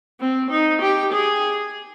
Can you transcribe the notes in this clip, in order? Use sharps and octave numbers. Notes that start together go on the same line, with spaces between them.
C4
D#4
G4
G#4